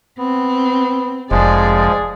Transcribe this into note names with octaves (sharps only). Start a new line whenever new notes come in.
B3 C4
F1 F3 G#3 G#4 D5